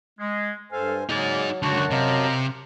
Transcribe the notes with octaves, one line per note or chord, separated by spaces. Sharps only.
G#3
G2 A4 C5 F5 G#5
C#3 F#3 A#3 D#4 G#4 D5
C#2 F#2 D3 F#3 F#4 A5
C3 D#5 F5 A#5